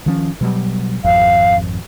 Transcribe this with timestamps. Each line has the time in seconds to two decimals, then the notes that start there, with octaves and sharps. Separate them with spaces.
0.06 D#3 F3 C#4
0.41 B2 F#3 G3
1.04 G#1 F2 F5